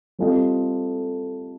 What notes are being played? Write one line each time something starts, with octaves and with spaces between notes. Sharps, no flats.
G3 C4 F4 A4 D#5